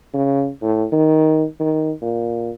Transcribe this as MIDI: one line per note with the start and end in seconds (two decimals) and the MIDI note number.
0.14 0.49 49
0.62 0.85 45
0.92 1.44 51
1.60 1.91 51
2.02 2.50 46